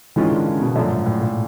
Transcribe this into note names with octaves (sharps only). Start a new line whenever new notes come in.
G#2 D#3 E3 G#3 C#4 F4
D3
C#3
B2
F#2 A#2 D3 F3 A3
G#2
A2
A#2